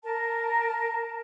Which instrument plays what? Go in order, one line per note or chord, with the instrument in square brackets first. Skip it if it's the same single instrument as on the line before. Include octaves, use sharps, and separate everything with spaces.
[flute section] A#4 A5